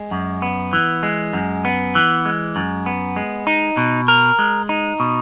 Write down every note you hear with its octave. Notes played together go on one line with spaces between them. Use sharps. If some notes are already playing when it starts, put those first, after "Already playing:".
Already playing: G#3
F#2
B3
E3
G#3
F#2
B3
E3
G#3
F#2
B3
G#3
D#4
B2
A#4
G#3
D#4
B2